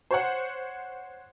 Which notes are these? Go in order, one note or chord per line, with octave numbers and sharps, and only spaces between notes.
C5 C#5 F#5